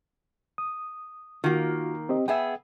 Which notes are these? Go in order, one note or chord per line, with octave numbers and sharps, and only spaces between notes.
D#6
D#3 A#3 F4 F#4
C4 G4 D#5
B3 G#4 E5 G5